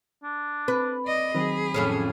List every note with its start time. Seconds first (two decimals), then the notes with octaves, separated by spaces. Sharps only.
0.23 D4
0.68 C4 B4
1.05 D5 D#5
1.35 D#3 F#3 C4 G#4 B5
1.74 F2 A2 C#4